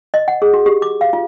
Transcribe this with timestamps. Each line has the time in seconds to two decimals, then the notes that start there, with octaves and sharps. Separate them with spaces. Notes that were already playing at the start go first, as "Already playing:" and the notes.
0.14 D#5
0.28 F#5
0.42 G#4
0.53 F#4
0.66 G4
0.82 D6
1.01 F5
1.13 F4